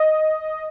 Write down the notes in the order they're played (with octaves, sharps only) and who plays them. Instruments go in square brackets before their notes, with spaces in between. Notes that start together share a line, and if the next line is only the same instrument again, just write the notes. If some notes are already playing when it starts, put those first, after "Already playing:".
Already playing: [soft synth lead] D#5